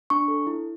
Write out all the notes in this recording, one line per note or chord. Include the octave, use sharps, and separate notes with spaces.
D4 C#6
A4
E4